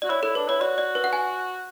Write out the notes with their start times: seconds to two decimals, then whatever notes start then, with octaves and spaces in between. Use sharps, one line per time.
0.02 F#4 D5
0.10 E4 C#5
0.22 E4 A4
0.35 D4 B4
0.48 E4 C#5
0.61 F#4 D5
0.78 D5
0.95 B4
1.04 F#5
1.13 G#5